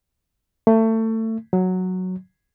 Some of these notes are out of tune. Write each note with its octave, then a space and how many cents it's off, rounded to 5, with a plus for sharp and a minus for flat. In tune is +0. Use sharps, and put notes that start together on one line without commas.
A3 +25
F#3 -5